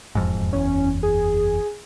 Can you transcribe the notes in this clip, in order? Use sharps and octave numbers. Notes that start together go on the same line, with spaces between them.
E1 F2 G#2
F#1 E2 C#4
G#4